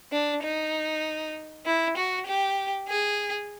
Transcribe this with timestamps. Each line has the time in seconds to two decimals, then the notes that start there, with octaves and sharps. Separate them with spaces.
0.12 D4
0.43 D#4
1.66 E4
1.97 F#4
2.27 G4
2.88 G#4